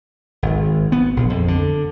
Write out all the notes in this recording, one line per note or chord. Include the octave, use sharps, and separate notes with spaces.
G#1
B3
A#1
F2
D3